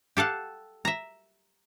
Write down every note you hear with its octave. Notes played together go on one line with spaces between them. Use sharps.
G4 A4 F5 F#5
E5 A#5